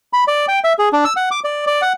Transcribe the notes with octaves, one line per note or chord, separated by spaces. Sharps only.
B5
D5
G5
E5
G#4
D4
E6
F#5
D6
D5
D5
F#5